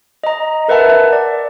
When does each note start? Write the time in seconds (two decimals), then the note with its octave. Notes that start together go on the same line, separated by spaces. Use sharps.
0.24 D#5 A#5
0.68 A#4 B4 E5 F#5 A5
1.13 D5